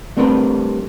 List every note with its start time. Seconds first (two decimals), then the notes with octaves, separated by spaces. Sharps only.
0.17 G3 A3 C4 D4 A#4 B4